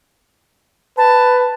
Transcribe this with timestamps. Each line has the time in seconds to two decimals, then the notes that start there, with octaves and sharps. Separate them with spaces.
0.98 B4 A5